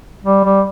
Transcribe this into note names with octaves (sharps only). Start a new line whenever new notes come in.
G3
G3